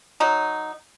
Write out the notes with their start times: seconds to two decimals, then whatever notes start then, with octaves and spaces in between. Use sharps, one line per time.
0.20 F#3 D#4